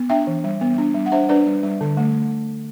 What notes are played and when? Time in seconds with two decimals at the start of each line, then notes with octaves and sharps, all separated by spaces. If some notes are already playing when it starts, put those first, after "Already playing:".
Already playing: B3
0.09 D4 E5 G5
0.27 E3
0.44 G3
0.61 B3
0.78 D4
0.95 G3
1.06 F#5
1.12 D4 C5 E5
1.29 D4 B4 D5
1.46 G3
1.63 G3
1.81 D3
1.97 A3